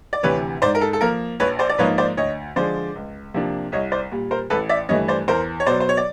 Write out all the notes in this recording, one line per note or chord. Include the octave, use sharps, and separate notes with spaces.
D5
D2 C3 E3 B4 C#5
G#2 C5 D5
A#4
A4
A4
F3 A#3 A#4
A#1 B4 C#5
C5 D5
D5
G#2 F3 A#3 D#4 B4 C#5
C5 D5
D2 C#5 D#5
D3 F3 G#3 C5 D5
C#2
C3 F3 A#3 D4
C2 C#5 D#5
C5 D5
A#2 G3
A#4 C5
A1 A4 B4
D5 E5
G2 E3 A3 C#5 D#5
C5 D5
E2 A#4 C5
C#5
B2 F#3 C5 D5
C5
C#5
D5